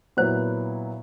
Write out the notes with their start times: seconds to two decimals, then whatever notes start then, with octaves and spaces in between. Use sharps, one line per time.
0.17 A#2 F#3 B3 E4 C5